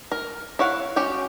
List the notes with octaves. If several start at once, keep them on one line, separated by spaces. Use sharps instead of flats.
A#4
E4 C#5 F5 F#5
C#4 F#4 G4 G5